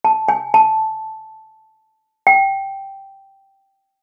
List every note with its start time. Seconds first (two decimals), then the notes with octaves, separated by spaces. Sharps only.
0.05 A5
0.28 G#5
0.54 A5
2.27 G5